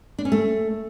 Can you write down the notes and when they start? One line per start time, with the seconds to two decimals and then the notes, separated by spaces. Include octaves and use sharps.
0.18 D4
0.25 C#4
0.32 A3